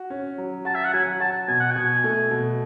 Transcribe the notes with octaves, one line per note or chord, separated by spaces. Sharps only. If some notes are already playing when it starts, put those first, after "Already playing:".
Already playing: F#4
C#4
F#3
F#4 A5
E5
F#5
F#3 G#5
F#4 A5
B2 G#5
F#5
B2 G#5
A3
B2